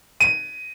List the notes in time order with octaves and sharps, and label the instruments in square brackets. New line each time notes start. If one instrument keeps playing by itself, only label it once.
[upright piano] D#7